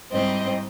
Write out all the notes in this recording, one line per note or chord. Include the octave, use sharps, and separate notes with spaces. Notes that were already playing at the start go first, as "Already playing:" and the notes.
G#2 E3 G3 C4 D#5